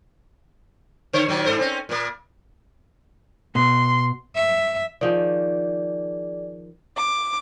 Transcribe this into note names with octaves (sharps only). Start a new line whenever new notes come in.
D3 C5 C#5
A#2 D#3 F#3
G#2 A4 C5
C4 C#4
A#2 A#3
B2 C6
E5
D#3 F3 G#4 D5
D6